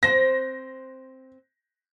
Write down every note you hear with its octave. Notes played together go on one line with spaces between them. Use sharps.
C4 C5 A#6